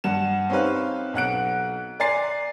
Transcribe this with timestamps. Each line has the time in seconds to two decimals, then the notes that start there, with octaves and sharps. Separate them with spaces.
0.04 G2 G3 F#5 E7
0.50 C4 C#4 D#4 G4 B4 F5
1.14 B1 F#5 F#6 D7
2.00 D5 G#5 A#5 C6 A6 C7